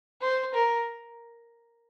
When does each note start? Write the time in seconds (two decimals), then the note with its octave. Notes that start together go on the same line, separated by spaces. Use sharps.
0.21 C5
0.54 A#4